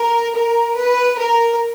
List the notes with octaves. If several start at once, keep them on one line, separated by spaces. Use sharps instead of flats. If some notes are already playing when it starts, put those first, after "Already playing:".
Already playing: A#4
A#4
B4
A#4